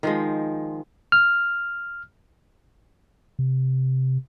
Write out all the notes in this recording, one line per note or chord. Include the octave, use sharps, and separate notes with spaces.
D#3 F3 G#3
F6
C3